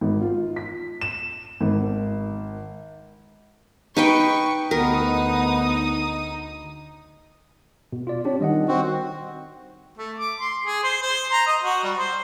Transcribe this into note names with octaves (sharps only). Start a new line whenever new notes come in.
G#1
F4
B6
E7
G#1
D#4 B4 G5 C#6
D2 B3 D#4 A#4 D#6
B2
F4 D5
C4 D4 G4 C#5
D#3 G3 D#5 F#5
C4 F#4
A3
D6
C6
G#4
C5
C5
A#5
D#5
F#4
G3
C5